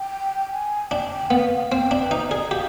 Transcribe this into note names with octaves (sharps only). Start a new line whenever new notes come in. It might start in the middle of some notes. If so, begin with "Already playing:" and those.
Already playing: G5
G#5
D4 G5
B3 F5
C4 G5
D4
B4
D#4 C5
G#4 D5
D#5
G4 F5